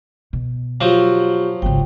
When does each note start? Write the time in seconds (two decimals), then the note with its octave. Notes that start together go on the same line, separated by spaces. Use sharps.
0.33 B2
0.81 F3 F#3 F4 G4 C#6
1.62 G#1 C#2 G5